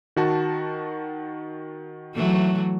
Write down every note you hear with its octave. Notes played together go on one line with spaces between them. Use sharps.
D#3 F#4 A5
E3 F#3 A3